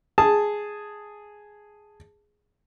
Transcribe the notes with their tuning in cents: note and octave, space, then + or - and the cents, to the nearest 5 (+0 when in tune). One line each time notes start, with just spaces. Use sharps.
G#4 +0 A5 +0